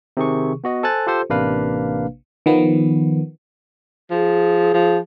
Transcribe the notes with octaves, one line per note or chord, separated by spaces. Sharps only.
C3 D#3 G#4 C#6
B3 F#4 D#5
A4 C5 G#5 A5 F#6 A6
F4 G4 A4 C5
A1 C3 A#3 D4 B4 F5
D#3 F3 B3
F3 G#4
F3